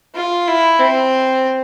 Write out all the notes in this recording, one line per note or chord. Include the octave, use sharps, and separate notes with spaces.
F4
E4
C4